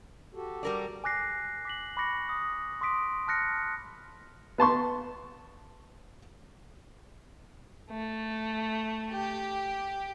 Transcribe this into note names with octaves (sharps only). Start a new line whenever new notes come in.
F#4 G4 A4
G3 A#4 D5
G#5 D6 F#6 A#6 C7
D6 B6 F#7
B5 C#6 D6 F#6 A#6 C#7
D#6
C6 D6 D#6 B6 D7
A5 F6 F#6 A#6 C#7
B3 A5 C6 C#6
A3
G4